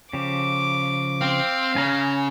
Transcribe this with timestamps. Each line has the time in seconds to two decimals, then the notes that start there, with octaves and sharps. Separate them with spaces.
0.13 C#3 F3 G4 D6
1.21 C4 F5
1.76 C#3 G#5 A#5